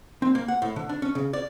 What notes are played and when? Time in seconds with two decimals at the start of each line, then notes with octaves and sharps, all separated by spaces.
0.22 C4
0.35 A#3
0.48 F#5
0.62 A2
0.76 D3
0.89 D4
1.02 C#4
1.15 C#3
1.33 D5